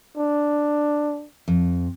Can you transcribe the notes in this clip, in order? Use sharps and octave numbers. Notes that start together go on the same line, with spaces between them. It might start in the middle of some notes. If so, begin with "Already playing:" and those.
D4
F2